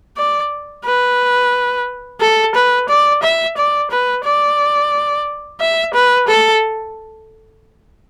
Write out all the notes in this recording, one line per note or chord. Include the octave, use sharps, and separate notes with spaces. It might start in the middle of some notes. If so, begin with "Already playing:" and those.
D5
B4
A4
B4
D5
E5
D5
B4
D5
E5
B4
A4